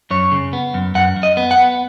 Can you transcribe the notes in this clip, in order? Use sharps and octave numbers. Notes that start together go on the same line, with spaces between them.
F#2 C#5
C#3
B3
F#2
F#2 F#5
F#2
D#5
B3
F#5
B3